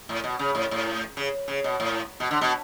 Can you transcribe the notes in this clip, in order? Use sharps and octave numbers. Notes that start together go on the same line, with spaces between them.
A2
B2
C#3
A2
A2
C#3
C#3
B2
A2
B2
D3
B2